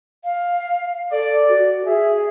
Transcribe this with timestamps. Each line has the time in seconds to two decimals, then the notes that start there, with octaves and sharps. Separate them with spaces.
0.24 F5
1.12 A4 D5
1.49 F#4
1.85 G#4 E5